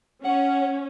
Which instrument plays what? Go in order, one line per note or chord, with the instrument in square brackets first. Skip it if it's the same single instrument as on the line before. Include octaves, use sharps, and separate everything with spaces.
[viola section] C#4 [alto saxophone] F#5